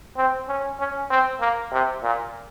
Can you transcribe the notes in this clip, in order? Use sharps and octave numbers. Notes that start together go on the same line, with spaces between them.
C4
C#4
C#4
C4
A#3
C3
A#2